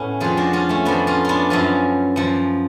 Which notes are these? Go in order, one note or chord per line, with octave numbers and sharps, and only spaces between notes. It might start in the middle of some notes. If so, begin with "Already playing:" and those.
Already playing: A2 A3 B3 C#4
F2 F3 F4 G#4
D4 F#4
C#4 F4
A3 C#4
F2 F3 B3 D4
C#4 F4
B3 D4 F4
F#2 F3 C#4 F4
F#2 F3